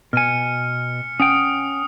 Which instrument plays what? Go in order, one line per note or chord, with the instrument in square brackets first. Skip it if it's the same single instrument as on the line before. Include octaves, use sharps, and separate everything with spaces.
[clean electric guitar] B2 G#5 [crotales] F6 C#7
[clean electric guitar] C#4 F#5 G5 [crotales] D#6